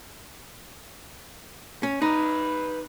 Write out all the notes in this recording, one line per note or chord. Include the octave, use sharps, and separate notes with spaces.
C#4
D#4 B4 D5